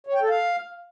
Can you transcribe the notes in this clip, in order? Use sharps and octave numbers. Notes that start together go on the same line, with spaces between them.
C#5
G5
A4
F5